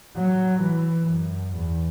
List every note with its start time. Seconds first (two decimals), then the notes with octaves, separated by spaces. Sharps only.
0.17 F#3
0.62 E3
1.10 F#2
1.56 E2